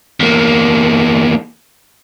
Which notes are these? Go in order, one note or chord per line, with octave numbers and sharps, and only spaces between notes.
E2 A#3